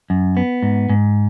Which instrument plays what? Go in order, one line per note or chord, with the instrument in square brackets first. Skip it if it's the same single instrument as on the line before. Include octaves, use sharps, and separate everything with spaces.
[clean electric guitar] F#2
B3
G#2
G#2